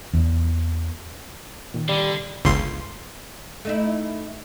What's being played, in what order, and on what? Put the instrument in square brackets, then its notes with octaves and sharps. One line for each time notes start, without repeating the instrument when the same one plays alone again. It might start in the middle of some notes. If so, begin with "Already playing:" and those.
[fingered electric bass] E2
[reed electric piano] A#2 D#3
[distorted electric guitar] D3 [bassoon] G3
[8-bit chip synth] G1 C#2 C6
[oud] A3 D#4 E4